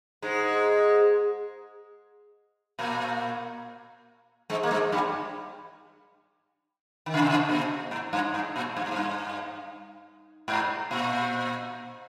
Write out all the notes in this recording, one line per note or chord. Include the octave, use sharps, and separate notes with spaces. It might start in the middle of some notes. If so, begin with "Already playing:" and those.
G#2 G#3
A#2 A#3
G#2 G#3
A#3
G#2 G#3
G2 G3
D#3
C#3
C3
C#3
A#2
G#2
G2
G#2
A#2
G2
G#2
G2
G#2
A#2